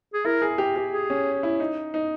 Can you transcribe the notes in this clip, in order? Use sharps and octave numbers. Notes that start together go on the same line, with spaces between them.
G#4
E4 A#4
G#4
G4
G4
G#4
C#4
E4
D#4
D#4